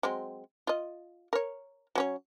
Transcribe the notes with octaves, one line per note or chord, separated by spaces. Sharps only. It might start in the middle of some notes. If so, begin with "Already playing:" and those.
F#3 G#3 C4
F4 D#5
A#4 C#5
F#3 C#4 C#5